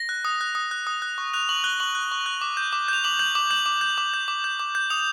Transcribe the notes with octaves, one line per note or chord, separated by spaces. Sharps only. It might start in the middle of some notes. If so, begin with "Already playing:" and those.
Already playing: A#6
F#6
D#6
F#6
D#6
F#6
D#6
F#6
C#6
F#6 F7
C#6 F#7
F#6 G7
C#6 F#7
F#6
C#6
F#6
D6
G6
D6
G6 F7
D6 F#7
G6 F#7
D6 F#7
G6 F#7
D6
G6
D6
G6
D6
G6
D6
G6
D#6 F7